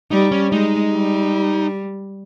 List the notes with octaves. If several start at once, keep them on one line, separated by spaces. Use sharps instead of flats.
G3 D#4
C#4
G#3 D#4
G3